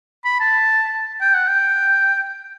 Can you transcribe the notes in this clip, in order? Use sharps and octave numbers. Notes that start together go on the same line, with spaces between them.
B5
A5
G5
F#5
G5